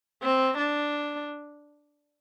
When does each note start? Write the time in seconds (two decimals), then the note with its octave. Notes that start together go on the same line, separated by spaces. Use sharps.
0.23 C4
0.58 D4